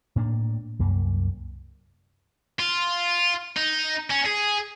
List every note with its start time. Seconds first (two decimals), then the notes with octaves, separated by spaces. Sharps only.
0.16 A2 A#3 D4
0.79 C2 F#2 A#3
2.59 F4
3.57 D#4
4.11 C#4
4.26 G#4